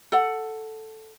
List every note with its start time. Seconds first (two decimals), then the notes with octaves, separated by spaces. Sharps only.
0.12 A4 F#5